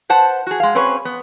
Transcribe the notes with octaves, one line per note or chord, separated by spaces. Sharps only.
B4 C5 F#5 A5
F#4 G#4
G#3 F5
C4 C#4 G#4 B4 C#5
B3